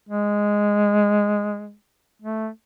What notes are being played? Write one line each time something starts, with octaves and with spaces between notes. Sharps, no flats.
G#3
A3